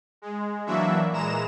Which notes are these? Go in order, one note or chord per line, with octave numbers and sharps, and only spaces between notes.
G#3
E3 F#3 A#3 D4 F#4 E5
A#2 E3 G#3 A#5 E7